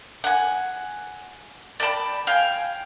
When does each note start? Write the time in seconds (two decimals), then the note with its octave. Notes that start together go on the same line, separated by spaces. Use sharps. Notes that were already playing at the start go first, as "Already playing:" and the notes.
0.24 F#5 G#5
1.80 D5 G5 A5 B5
2.27 F5 G5 G#5